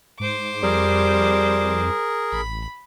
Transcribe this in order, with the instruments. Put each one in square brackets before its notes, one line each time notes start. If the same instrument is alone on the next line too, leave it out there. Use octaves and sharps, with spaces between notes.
[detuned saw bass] G#2 [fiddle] C5 D6
[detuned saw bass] F2 [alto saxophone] G3 [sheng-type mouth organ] G#4 A#4
[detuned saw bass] A1 [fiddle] B5